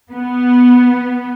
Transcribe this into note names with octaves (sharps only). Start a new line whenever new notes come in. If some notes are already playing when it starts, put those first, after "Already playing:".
B3